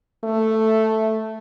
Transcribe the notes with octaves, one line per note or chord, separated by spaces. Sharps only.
A3